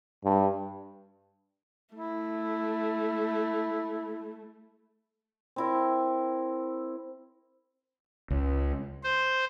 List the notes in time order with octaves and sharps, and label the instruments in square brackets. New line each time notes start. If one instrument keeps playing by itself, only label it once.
[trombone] G2
[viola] A3 [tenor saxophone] E4
[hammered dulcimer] C4 E4 A#4
[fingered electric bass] C#2
[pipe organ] C5